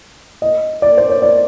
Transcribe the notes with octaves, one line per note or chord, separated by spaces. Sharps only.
D#5
D5
C5
C#5
D5